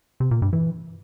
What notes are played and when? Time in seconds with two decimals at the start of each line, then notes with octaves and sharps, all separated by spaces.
0.20 C3
0.31 A#2
0.42 G2
0.53 E3